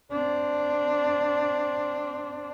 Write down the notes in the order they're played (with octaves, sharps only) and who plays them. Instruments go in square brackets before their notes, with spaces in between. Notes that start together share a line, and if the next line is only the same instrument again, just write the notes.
[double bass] C4 D4